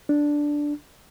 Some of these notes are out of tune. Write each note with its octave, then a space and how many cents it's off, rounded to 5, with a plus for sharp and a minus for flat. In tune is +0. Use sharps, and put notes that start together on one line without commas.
D4 +0